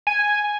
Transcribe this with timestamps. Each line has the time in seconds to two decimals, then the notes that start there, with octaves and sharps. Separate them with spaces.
0.07 G#5